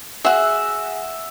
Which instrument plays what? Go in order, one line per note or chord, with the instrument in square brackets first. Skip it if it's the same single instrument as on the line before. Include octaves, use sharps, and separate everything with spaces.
[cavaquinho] F#4 G#4 [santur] E5 F#5